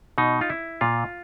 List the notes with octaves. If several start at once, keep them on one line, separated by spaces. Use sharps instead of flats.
B2 D#4
F4
E4
A#2 F4